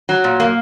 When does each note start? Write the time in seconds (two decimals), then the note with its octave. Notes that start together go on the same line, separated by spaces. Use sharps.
0.09 F#3
0.24 A#2
0.40 A#3